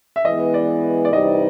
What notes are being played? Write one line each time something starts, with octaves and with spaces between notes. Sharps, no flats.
E5
E3 G#3 B3 D#5
D5
D5
C3 E3 G3 C4 D#4 D#5